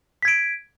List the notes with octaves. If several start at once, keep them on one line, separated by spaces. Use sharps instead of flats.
G#6 B6 D7